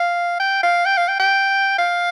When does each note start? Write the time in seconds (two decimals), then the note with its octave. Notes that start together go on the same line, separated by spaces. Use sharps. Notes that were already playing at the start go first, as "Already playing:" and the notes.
Already playing: F5
0.40 G5
0.63 F5
0.86 G5
0.97 F5
1.08 G5
1.20 G5
1.78 F5